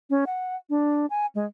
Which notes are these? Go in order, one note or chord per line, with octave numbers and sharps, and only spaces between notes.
C#4
F#5
D4
G#5
G#3